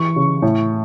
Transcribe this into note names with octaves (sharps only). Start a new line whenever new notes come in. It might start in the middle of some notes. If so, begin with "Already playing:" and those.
Already playing: E3 C#6
C#3
A2